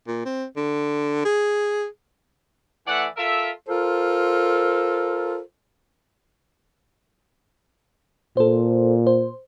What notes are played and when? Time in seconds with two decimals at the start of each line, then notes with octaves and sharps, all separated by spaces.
0.07 A#2
0.25 C4
0.57 D3
1.25 G#4
2.87 E3 A3 D5 E5 F#5
3.17 F4 A4 A#4 E5
3.67 F4 A4 A#4 C5
8.37 A#2 A4 C5
9.07 C5